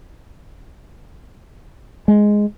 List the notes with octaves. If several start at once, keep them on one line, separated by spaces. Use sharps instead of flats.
G#3